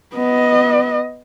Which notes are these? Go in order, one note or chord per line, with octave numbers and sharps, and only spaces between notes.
B3 D#5